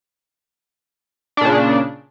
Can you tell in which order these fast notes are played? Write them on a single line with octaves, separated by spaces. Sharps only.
D4 A#2 C#3